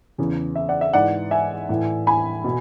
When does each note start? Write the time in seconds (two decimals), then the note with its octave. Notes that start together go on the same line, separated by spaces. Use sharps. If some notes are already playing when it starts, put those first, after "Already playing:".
0.18 E2 C#3 E3
0.56 E5
0.69 D5 F#5
0.81 E5
0.93 G#2 E3 D5 F#5
1.31 E5 G#5
1.69 A2 E3
2.07 G#5 B5
2.44 B2